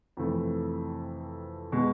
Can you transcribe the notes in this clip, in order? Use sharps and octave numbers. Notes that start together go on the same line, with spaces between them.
F2 C3 E3 A3
B2 G#3